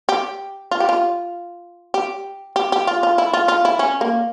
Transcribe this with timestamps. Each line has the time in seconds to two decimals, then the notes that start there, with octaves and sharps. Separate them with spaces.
0.09 G4
0.71 F4
0.80 G4
0.89 F4
1.94 G4
2.56 G4
2.72 G4
2.87 F4
3.03 F4
3.18 E4
3.33 F4
3.48 F4
3.65 E4
3.79 C#4
4.01 A#3